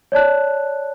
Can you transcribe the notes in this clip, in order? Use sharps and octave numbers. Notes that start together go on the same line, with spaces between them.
C#5 D5 A5 F#6